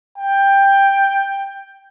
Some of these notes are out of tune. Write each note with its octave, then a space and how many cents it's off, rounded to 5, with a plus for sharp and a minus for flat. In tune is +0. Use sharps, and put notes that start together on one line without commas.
G5 +10